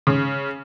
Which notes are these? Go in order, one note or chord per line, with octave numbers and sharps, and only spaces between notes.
C#3